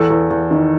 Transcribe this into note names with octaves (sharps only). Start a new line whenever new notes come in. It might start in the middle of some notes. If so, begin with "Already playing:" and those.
Already playing: E2 A4
E2
E2
D#3